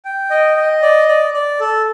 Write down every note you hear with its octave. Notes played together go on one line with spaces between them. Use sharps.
G5
D#5
D#5
D5
D5
D5
A4